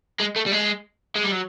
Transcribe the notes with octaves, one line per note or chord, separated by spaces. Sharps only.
G#3
A3
G3
G#3
G#3
G3
F#3